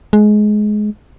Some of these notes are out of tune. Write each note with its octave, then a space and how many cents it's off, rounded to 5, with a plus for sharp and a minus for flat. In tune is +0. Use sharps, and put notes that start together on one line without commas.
G#3 +20